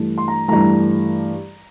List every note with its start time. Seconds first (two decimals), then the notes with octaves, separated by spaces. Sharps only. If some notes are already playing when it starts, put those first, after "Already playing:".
Already playing: G2 E3 A3
0.18 C6
0.28 A#5
0.48 G2 E3 A3 A#5